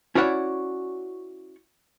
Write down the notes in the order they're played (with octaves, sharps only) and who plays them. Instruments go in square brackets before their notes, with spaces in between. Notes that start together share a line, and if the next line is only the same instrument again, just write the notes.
[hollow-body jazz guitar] C#4 E4 F#4 C#5 D5 F#5